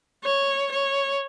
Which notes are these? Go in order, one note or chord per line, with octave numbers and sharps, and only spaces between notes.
C#5
C#5